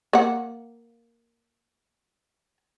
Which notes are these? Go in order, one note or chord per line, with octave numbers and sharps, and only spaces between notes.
A#3 F#5